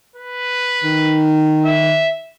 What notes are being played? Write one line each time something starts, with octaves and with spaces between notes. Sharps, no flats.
B4
D#3
E5